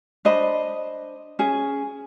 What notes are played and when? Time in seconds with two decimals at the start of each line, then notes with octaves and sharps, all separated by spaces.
0.25 D4 C5 D#5 B5
1.39 C#4 G#4